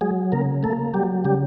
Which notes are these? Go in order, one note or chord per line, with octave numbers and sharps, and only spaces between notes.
F#3 G#3 G#4
C#3 A#3 A#4
A3 A#3 A4
F#3 G3 G4
C#3 G3 G4